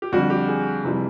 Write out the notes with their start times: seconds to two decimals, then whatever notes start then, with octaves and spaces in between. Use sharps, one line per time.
0.02 G4
0.12 F2 D3 G3 F#4
0.30 G4
0.48 G#4
0.85 F2 C3 E3 G3